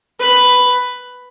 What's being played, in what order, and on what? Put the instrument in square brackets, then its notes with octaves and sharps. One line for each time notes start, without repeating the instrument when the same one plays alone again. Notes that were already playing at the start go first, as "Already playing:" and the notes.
[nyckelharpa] B4